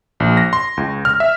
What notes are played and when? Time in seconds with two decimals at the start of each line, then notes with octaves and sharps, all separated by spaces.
0.20 A#1
0.37 A#6
0.53 C6
0.77 C#2
1.05 F6
1.20 E5